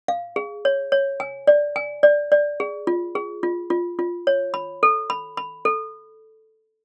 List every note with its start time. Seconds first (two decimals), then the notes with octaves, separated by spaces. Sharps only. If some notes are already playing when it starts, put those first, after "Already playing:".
0.08 F5
0.36 G#4
0.65 C#5
0.92 C#5
1.20 G#5
1.47 D5
1.76 G#5
2.03 D5
2.32 D5
2.60 G#4
2.87 F4
3.15 G#4
3.43 F4
3.70 F4
3.99 F4
4.27 C#5
4.54 B5
4.83 A4
5.10 B5
5.37 B5
5.65 A4